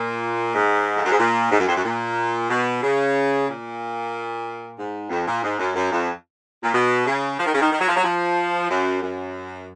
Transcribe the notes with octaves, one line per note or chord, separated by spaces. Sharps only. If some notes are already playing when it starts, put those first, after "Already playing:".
Already playing: A#2
G#2
F2
F#2
G#2
A#2
G#2
F#2
F2
F#2
A#2
B2
C#3
A#2
G#2
F2
A#2
G#2
F#2
F#2
F2
A#2
B2
C#3
F3
D#3
C#3
D#3
D#3
F#3
F3
F#3
F3
F#2
F#2